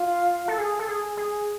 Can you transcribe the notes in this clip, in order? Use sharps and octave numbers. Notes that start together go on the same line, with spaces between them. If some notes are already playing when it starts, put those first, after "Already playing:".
Already playing: F4
A4
G#4
A4
G#4
G#4